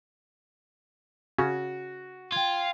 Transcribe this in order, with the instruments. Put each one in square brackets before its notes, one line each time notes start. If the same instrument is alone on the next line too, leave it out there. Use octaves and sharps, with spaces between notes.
[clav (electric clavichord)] C#3 C#4 [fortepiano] F#4
[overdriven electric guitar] F4 [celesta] G5 G#6